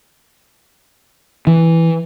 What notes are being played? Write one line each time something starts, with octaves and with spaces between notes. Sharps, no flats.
E3